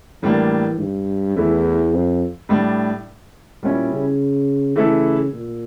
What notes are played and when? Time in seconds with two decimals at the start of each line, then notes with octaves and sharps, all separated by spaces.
0.23 A2 E3 G3 A#3 D4
0.80 G2
1.36 E2 E3 A3 E4
1.93 F2
2.49 A2 G3 D4
3.62 A#2 G3 C#4 E4
3.91 C#3
4.76 C#3 E3 A3 E4 A4
5.33 A#2